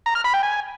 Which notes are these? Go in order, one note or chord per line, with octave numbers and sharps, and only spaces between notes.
A#5
F6
B5
G5
G#5